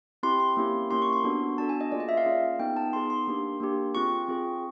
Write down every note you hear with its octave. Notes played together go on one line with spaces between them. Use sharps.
C4 E4 G4 C6
C6
A#3 C#4 E4 G4
A#3 C#4 E4 G4 C6
C#6
C6
B3 D4 F#4 A4
B3 D4 F#4 A4 A5
G#5
D#5
A#3 C#4 F4 G#4 D5
D#5
E5
F5
A#3 C#4 F4 G#4
B3 D#4 G#4 G5
A5
B3 D#4 G#4 C6
C6
A#3 D4 G4
A#3 D4 G4
C4 F4 G#4 C#6
C4 F4 G#4